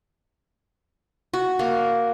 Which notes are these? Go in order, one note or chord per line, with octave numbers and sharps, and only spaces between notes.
F#4
A#3